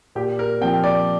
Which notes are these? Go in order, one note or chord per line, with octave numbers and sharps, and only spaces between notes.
A#2 G4
A#4
F3 C4 G5
D5